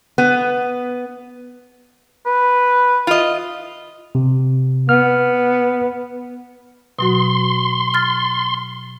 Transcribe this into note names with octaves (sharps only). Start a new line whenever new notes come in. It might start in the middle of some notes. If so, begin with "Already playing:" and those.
B3
B4
F4 D#5
C3
B3 F6
B2 F#3 F#4 C6
F6 A6